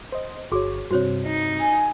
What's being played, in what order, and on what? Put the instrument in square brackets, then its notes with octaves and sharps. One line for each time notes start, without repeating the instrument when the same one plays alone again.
[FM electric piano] C5 D#5
[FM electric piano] G1 C#5 [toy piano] F#4 G#4 D6
[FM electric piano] G2 C3 [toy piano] F#4 C5 C#5
[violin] D#4
[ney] G#5